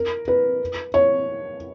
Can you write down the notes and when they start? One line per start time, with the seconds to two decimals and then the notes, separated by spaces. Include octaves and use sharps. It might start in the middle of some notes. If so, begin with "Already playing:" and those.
Already playing: A#4
0.28 B4
0.94 C#5